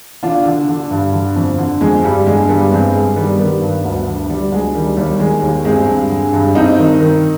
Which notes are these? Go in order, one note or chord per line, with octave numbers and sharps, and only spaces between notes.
D3 D4 F4
D3
D3
G2
D3
F2
D3
F2 G#3
G2 G3
D3 G#3
G2 G3 B3
G2 G#3 C4
G2 G#3
D#3 G3 B3
D#3 G3 B3
G2
D2
D3
D3 G3
D2 G#3
D#3 G3
D#2 G3
D#3 G#3
D#2
G2 G#3 C4
G2
D3
G2
G2 C4 D#4
D#3
D#3